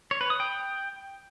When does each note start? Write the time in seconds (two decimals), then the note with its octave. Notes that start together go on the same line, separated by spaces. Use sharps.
0.11 C#5
0.21 B4
0.30 D#6
0.40 G5